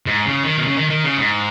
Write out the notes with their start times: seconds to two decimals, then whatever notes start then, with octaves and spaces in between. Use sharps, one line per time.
0.06 G#2
0.26 C#3
0.44 D#3
0.58 B2
0.67 C#3
0.76 D#3
0.90 D#3
1.04 C#3
1.18 G#2